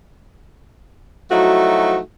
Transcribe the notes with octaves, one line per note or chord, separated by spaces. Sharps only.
F3 F#3 A3 D#4 E4 F#4